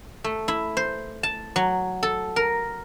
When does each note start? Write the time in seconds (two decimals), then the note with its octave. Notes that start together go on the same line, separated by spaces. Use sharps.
0.24 A3
0.48 E4
0.77 C5
1.23 A5
1.56 F#3
2.03 A4
2.36 A#4